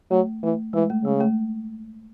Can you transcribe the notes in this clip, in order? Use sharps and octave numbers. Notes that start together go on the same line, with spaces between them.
F#3 A3
E3 A3
E3 G#3
A3
C#3 G#3
A3